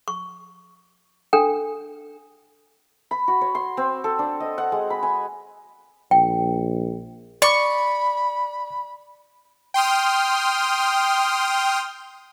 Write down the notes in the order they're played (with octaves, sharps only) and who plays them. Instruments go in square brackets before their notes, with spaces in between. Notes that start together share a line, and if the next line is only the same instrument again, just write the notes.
[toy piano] C#6
D4 A4 G5
[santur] B5
F#4
C#5
C6
C4
A4
D4
D#5
F#5
G#3
B5
G#5
[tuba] A#1 [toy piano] G5
[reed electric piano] D5 [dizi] B5 [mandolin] C#6
[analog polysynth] G5 C6 D#6 F6